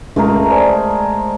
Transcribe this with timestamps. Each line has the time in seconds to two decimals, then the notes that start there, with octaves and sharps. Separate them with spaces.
0.16 C#2 G#3 A3 A#4
0.50 C5 D5 G#5